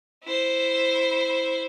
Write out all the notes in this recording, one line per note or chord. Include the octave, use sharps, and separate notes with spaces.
E4 C5